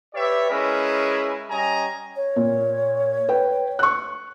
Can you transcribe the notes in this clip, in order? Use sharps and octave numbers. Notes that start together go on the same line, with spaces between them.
G4 B4 C#5 D5 E5
G#3 C#4 E4 G#4 A#4 B4
G3 C#4 D#5 G#5 A#5
C#5
A#2
B4 G5
C#6 F#6